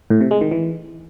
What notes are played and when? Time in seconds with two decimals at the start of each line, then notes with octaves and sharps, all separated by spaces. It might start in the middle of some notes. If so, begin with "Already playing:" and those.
0.10 A2
0.21 C3
0.31 G#3
0.41 D#3
0.51 E3